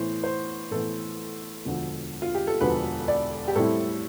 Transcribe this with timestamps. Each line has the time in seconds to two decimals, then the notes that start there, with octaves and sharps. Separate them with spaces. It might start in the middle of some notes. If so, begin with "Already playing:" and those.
Already playing: A2 E3 B3 C5
0.24 C5
0.71 A2 E3 B3 A4
1.65 E1 D2 D3 F3
2.22 F4
2.35 G4
2.47 A4
2.61 E1 D2 D3 F3 B4
3.08 D5
3.48 G4
3.56 A2 G3 C4 E4 A4